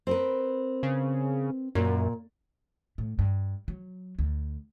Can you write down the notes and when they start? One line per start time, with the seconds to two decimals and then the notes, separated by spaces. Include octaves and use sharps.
0.07 C4 A#4 B4
0.83 C#3
1.75 F#2 A#2
2.98 A2
3.19 G2
3.68 F#3
4.19 D2